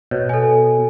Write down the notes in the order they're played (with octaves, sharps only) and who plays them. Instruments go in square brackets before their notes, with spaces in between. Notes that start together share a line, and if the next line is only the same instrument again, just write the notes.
[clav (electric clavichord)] B2 [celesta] C#5
[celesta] A4 G#5